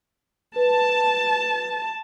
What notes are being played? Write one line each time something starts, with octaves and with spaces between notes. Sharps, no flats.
B4 A5